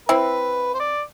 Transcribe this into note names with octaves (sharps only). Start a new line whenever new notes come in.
C4 E4 B4
C5
D5